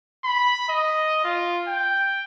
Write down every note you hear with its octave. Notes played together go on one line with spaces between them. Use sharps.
B5
D#5
F4
G5